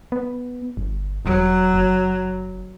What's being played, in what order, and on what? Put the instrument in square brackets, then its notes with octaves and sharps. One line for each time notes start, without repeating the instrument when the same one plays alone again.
[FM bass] B3
G1
[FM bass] E1 [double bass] F#3
[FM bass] F#1